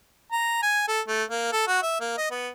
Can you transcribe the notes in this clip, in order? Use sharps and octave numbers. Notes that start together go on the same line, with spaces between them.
A#5
G#5
A4
A3
A#3
A4
F#4
E5
A#3
D#5
B3